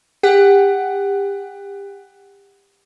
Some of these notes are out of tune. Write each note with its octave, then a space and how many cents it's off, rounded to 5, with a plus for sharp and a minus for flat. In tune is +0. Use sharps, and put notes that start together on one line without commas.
G4 +30 F#5 +10